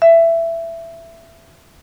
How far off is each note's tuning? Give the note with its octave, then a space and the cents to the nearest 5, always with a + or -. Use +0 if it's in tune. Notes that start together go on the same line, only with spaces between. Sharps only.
E5 +15